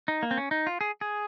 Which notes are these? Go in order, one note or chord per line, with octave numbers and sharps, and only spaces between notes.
D#4
A#3
C4
C#4
D#4
F4
G#4
G#4